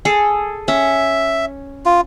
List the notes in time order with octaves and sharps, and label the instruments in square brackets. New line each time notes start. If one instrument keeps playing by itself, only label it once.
[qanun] G#4 A4
[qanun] C#4 [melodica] E5
[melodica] F4